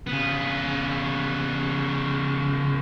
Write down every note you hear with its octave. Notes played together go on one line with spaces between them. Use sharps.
C#3 B3